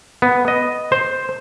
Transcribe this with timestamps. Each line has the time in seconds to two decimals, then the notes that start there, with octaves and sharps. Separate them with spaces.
0.22 B3
0.48 D#5
0.92 C5